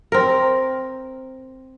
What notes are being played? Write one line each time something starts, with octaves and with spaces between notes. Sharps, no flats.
C4 A#4